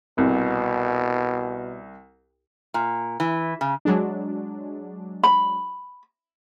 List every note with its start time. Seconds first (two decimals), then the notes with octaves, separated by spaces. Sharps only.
0.18 C2 B2
2.74 A#2
3.20 E3
3.61 C#3
3.85 F#3 G#3 D4
5.23 B5